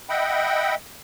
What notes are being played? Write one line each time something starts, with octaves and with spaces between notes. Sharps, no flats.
D#5 E5 F#5 G5 B5